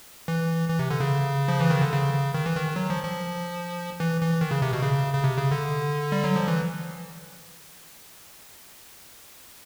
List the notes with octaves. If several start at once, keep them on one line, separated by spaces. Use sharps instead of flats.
E3
E3
C3
D3
C#3
F3
E3
D#3
D3
C#3
D#3
E3
D#3
F#3
F3
F3
E3
E3
D#3
C#3
C3
B2
C#3
C#3
C3
C#3
D3
G3
F#3
F3
E3